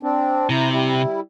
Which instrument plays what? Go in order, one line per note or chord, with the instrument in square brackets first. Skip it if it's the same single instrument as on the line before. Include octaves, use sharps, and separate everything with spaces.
[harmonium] C4 D4
[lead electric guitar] C3 [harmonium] E4 A#5
[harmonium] G3 E4